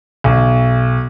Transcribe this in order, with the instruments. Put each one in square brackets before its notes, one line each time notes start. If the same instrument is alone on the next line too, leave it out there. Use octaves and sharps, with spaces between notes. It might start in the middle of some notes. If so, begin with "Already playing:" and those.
[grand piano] B1